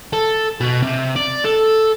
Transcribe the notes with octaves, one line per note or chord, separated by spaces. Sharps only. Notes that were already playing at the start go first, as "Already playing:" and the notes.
A4
B2
C3
D5
A4